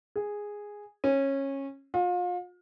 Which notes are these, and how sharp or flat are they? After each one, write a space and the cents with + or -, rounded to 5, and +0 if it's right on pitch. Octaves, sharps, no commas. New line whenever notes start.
G#4 -5
C#4 -20
F4 +35